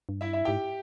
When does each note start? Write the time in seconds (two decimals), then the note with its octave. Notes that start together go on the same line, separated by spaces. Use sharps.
0.09 G2
0.21 E4 E5
0.33 E4 E5
0.45 G#2 G4 G5